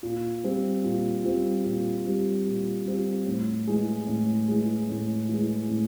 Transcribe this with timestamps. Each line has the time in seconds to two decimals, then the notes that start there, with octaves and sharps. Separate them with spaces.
0.03 A#2
0.44 G3 C4 F4
0.84 A#2
1.24 G3 C4 F4
1.64 A#2
2.05 G3 C4 F4
2.46 A#2
2.86 G3 C4 F4
3.26 A2
3.67 E3 G#3
4.07 A2
4.48 E3 G#3
4.89 A2
5.29 E3 G#3
5.69 A2